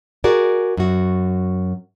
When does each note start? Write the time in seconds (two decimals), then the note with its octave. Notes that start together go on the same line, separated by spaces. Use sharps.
0.24 F#4 G#4 A#4 D5
0.77 F#2 F#4